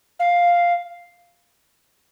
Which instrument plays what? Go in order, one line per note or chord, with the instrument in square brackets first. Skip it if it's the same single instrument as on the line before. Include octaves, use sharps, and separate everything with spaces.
[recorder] F5